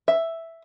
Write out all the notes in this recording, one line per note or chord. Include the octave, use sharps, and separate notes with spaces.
E5